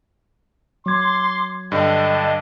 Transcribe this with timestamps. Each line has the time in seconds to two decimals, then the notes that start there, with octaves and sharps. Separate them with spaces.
0.86 F#3 C6 D6 G#6
1.72 G2 D3 D4 D#5 G5 A5